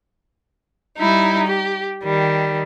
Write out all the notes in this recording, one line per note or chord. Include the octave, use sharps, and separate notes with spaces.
G3 D#4 E4
G4
D#3 G3